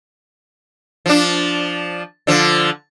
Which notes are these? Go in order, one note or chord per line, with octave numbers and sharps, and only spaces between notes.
F3 D4
D3 F3